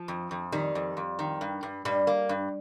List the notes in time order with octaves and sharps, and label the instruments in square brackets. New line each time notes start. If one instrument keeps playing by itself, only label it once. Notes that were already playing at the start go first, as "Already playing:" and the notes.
Already playing: [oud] F3
[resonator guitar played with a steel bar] F2
F2
[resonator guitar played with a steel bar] D#3 [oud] G3
[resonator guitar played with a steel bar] F2
F2
D#3
G2
G2
[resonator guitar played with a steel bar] G2 [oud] G3
[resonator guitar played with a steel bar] A#3
G2